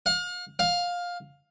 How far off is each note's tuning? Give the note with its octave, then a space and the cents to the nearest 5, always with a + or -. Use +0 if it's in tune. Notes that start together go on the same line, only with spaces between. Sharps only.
F5 +40
F5 +15